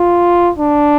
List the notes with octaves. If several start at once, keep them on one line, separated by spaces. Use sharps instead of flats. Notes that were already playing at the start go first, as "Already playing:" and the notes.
Already playing: F4
D4